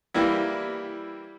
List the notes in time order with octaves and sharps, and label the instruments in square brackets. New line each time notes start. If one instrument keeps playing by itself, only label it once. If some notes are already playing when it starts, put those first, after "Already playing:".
[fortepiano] E3 G3 A#3 E4